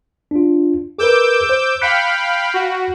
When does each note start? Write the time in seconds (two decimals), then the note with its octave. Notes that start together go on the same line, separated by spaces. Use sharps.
0.31 D4 F4
0.98 G#4 A#4 B4 D6 E6 G6
1.49 C5
1.81 F5 G5 B5 F#6 B6 C#7
2.54 F#4